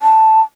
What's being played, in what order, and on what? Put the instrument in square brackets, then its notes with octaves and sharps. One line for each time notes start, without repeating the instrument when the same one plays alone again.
[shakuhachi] A5